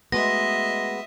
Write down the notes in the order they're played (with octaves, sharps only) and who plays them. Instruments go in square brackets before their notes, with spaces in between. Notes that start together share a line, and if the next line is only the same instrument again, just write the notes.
[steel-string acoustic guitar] G#3 B3 [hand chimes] A3 F#4 C6 [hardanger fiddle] D#5 E5 [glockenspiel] A#6